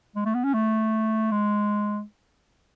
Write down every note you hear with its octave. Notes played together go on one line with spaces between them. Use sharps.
G#3
A3
B3
C#4
A3
G#3